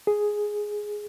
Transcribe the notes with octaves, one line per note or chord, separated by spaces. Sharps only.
G#4